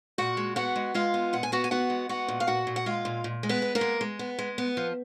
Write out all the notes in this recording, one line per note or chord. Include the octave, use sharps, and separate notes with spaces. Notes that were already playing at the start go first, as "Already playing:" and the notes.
A#2 F#4 F#5
G#3
B3 F#4 F#5
G#3
G#3 F4 F5
B3
A#2 F#5
G#5
B3 F#4 F#5
G#5
B3 F#4 F#5
G#3
B3 F#4 F#5
A#2
F5
A#2 F#4 F#5
A#2
F#5
G#3 F4 F5
A#2
A#2
G#3
B3 B4
B3
A#3 A#4
G#3
G#3
B3
G#3
B3
F3